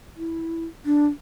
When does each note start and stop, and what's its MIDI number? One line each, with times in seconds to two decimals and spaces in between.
0.17 0.65 64
0.86 1.07 62